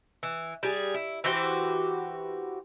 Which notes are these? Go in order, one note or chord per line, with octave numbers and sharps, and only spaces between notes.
E3
G3 G#4
E4
E3 F#4 G4 C5